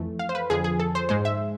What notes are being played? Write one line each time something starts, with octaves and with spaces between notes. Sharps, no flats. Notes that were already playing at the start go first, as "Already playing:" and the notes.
Already playing: F2 E3 A3
F5
C5
B4
F2 D3 F3 G#4
G#4
A4
C5
G#2 G#3 C5
E5